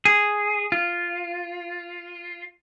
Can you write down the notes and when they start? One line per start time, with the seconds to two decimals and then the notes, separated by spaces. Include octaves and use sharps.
0.05 G#4
0.72 F4